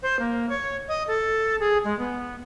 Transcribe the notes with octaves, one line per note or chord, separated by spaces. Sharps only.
C5
A#3
C#5
D#5
A4
G#4
G#3
B3